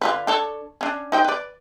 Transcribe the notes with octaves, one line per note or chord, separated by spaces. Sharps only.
D3 F4 B4
D4 A4 C#5
C#4 D4
D#4 C5 G5
B4 D5